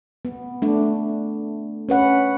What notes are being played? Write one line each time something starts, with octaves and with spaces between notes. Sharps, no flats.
B3
A3 D4
C#4 B4 F#5